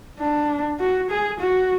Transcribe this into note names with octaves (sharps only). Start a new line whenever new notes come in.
D4
F#4
G#4
F#4